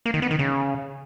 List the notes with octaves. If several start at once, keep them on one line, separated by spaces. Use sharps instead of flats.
A#3
D#3
B3
D#3
C#3